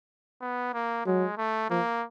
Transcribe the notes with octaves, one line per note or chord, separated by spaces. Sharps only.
B3
A#3
F#3 G#3
A3
F3 A#3